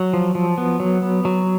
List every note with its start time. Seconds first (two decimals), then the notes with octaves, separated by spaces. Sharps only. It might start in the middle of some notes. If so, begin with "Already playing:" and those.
Already playing: F#3
0.13 F3
0.35 F3
0.58 B3
0.80 F#3
1.02 B3
1.25 F#3